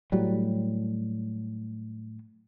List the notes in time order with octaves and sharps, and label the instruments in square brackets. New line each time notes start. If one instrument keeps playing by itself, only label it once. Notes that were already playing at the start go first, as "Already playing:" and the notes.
[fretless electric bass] A2 F#3 G3